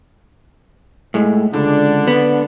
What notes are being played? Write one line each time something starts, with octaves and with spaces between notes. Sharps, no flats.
A2 G#3
C#2 D3 D4
B3